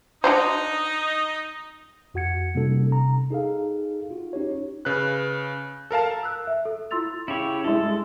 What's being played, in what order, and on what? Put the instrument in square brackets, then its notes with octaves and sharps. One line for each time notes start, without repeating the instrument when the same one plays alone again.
[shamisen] D4 F#4 C5 [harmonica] D#4 D#5
[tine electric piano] F2 F#4 F#5 G#6 C#7
C3 G3 A#3 C#4 D#4 A4
C3 A#5
D#4 G#4 A4 F5
F4 F#4
C#4 D#4 G4 C#5
[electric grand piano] C#3 B4 F#6
A4 A#4 F5 A5
[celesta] E6 F#6
E5
A4
E4 F4 C6 E6 A6 F7
[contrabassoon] C#3 [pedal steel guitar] E4 G4 C#5
[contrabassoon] G2 [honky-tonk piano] G#3 E4 [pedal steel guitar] A4